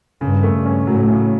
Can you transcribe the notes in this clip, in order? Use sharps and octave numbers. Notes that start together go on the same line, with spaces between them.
G2 C#3
A3
G2
C#4
A2 F#3
C#3